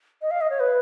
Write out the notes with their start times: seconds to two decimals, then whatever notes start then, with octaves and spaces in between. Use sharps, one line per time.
0.22 D#5
0.31 F5
0.41 D#5
0.50 C#5
0.60 B4